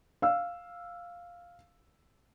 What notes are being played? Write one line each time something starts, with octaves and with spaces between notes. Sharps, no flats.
F5 E6